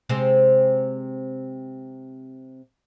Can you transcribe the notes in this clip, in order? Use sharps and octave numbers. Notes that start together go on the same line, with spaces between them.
C3 G#3 C4